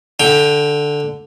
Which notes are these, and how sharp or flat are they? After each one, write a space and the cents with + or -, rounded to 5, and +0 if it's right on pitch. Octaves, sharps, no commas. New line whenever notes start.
D3 +0 G5 +15